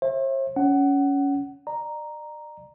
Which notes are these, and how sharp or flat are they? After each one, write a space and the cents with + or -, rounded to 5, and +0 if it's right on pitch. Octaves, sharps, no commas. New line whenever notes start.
C5 +45 E5 +0
C#4 +15 F#5 +20
D5 +35 A#5 +0